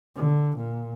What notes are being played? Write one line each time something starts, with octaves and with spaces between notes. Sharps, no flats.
D3
A#2